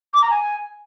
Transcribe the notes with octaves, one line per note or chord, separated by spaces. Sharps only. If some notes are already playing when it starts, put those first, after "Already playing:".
D6
A#5
G#5